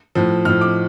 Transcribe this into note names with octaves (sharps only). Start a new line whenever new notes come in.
A2 F3
A2 F3 F6
D6